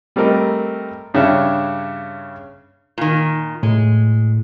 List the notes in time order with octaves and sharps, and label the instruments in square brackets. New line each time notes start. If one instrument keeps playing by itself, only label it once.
[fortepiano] G3 A3 C4 A#4 D#5
G2 C#3 D4 C#5 E5
[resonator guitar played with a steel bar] A#2 D#3
[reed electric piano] A2 [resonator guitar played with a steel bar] G#3